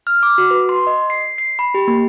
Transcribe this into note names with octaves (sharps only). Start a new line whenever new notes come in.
F6
D6
F#4
B4
C6
D#5
C7
C7
B5
G4
A#3